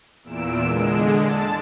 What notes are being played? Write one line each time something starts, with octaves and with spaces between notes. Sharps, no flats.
E2 A#2 E6 D7 E7
D3 G#3
A5